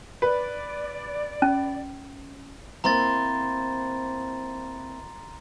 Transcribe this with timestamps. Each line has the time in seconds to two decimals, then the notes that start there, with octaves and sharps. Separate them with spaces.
0.22 B4 D5
1.42 C#4
2.84 A#3 C4 E4 A#5 C6 A6